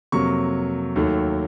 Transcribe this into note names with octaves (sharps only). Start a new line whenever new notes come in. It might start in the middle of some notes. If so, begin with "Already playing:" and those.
F2 C3 F#3 A#3 C#6
D#2 D#3 F#3 A3